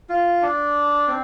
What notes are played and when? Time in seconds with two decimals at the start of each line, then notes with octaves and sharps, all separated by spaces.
0.09 F4
0.42 D4
1.08 C4